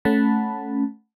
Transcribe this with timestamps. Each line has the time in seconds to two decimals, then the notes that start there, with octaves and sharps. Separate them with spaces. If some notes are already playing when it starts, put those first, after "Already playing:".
0.05 A3 C#4 F#5 A5 B5